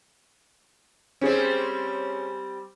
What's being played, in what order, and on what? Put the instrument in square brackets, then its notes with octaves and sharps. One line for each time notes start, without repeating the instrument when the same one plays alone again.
[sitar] G3 C4 [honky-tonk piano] C#4 G#4 C5